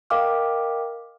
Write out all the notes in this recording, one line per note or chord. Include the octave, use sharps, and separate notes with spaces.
A#4 D#5 F5 G5 D6 F6